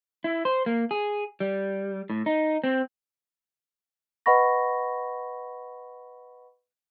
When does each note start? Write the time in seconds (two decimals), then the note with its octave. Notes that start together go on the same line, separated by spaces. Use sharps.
0.24 E4
0.45 C5
0.66 A#3
0.91 G#4
1.40 G3
2.10 A2
2.26 D#4
2.64 C4
4.26 B4 D#5 F#5 B5 C#6 A#6